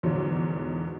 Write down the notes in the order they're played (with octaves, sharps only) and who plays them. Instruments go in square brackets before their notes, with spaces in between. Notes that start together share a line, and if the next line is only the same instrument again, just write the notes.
[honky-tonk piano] E2 G#2 B2 D3 F3 F#3